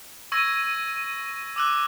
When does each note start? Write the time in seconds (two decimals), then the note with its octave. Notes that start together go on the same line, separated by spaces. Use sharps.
0.32 C#6 E6 G#6 A#6 D#7
1.56 D6 E6 F#6